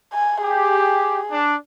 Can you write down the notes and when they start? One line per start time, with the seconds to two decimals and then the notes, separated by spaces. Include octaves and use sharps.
0.13 G#5
0.43 G4 G#4
1.31 D4